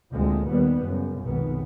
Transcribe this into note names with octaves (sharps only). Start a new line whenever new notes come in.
D2 A#2 D3 F3 G#3 C4
D#2 D#3 G3 B3
F#2 C#3
F1 B1 G#2 D#3 B3